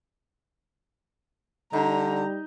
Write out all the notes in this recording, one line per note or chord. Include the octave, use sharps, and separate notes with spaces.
D3 G3 D#4 A#5